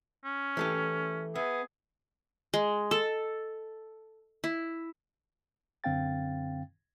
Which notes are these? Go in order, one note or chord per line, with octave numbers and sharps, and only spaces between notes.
C#4
E3 A3 G4
B3 G#4 E5
G#3
A4
E4
F#2 D3 C4 F5 G5 A6